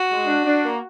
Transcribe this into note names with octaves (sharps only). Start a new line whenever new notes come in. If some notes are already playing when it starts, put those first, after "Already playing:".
Already playing: F#4
G#3
D4
D4
A#3